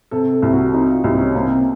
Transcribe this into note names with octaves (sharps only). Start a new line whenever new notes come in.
C3 A4
A4
C2
F#4
C3 D#4
F4
C2 D#4
C#4
C3 A#3